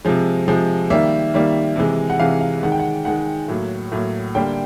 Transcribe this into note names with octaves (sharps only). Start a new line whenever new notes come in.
C3 F3 G#3
C3 F3 G#3
D#3 G3 A#3 E5
D#3 G3 A#3
C3 E3 G#3
F#5
C3 E3 G#3 F5
F5
D#3 G#3 F#5
G5
F#5
D#3 G#3 F#5
A2 F#3 A#3
A2 F#3 A#3
D3 G3 A#3 G5